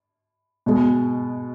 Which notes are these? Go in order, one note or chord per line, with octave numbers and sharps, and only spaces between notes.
B2 G#3